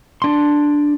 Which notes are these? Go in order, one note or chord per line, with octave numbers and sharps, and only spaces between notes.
D4 C6